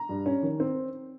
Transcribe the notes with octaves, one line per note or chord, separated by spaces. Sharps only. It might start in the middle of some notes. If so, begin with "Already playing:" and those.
Already playing: A#5
G2
C#4
D#3
C4